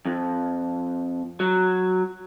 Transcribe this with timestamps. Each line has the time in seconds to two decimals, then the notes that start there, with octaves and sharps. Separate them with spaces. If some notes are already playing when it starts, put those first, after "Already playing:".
0.05 F2
1.40 F#3